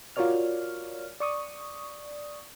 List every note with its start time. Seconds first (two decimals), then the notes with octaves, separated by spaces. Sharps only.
0.16 F4 F#4 A#4 C#5 D5 F6
1.20 D5 C#6 D#6